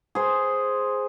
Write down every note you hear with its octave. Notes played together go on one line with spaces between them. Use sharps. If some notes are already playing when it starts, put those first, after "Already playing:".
G#4 C5